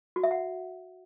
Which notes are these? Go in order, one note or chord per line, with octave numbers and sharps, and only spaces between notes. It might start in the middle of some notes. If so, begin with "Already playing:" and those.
F#4
E5
F#5